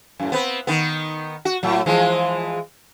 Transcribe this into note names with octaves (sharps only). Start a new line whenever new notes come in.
F#2 A2
B3 C4 B4
D#3 B3
F#4
A2 F#3
E3 F3 G#3